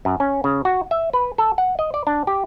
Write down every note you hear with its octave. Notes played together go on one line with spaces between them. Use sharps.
F#2
C#4
C#3
F#4
E5
B4
A4
F#5
D#5
D5
D4
G4